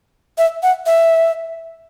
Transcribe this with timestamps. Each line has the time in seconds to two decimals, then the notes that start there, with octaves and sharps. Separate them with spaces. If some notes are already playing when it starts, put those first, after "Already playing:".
0.38 E5
0.63 F#5
0.86 E5